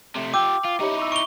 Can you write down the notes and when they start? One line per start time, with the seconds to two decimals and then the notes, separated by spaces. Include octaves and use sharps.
0.16 C3 A3
0.34 F4 G4 G5 D6 E6 G6
0.65 F4
0.81 D#4 E4 G4 C#5 C#7
0.98 C#6 E6
1.12 C#6 D7 D#7 F7 G7